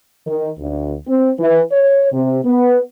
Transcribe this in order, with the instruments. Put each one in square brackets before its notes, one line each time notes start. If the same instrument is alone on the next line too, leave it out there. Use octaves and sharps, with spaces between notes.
[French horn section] D#3
D2
C4
E3
C#5
C3
B3